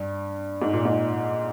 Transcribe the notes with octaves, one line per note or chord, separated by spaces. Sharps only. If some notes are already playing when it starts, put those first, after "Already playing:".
Already playing: G2
G#2
A#2
G#2